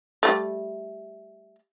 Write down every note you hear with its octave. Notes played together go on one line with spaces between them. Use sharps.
G3 A3